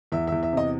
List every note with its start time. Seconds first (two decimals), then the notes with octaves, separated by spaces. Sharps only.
0.12 E2 E5
0.27 E2 E5
0.43 E5
0.53 C3 D#5